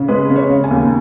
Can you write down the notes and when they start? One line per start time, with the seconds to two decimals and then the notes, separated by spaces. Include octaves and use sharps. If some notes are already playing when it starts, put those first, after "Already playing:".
Already playing: C#3
0.08 G#3 B4
0.30 C#3
0.36 C#5
0.49 C#3
0.64 G#5
0.71 D#2